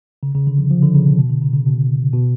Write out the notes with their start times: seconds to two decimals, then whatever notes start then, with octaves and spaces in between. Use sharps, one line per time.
0.23 C#3
0.35 C#3
0.47 D3
0.58 F3
0.71 F3
0.82 D3
0.95 C#3
1.06 B2
1.18 B2
1.30 D3
1.42 C#3
1.54 C#3
1.66 B2
2.13 B2